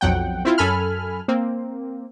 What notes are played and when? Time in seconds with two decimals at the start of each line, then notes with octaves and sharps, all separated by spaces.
0.01 B1 F2 F#3 F#5 G5
0.45 C4 E4 F4
0.58 F#2 A4 G#5 B5 F6
1.28 A#3 C4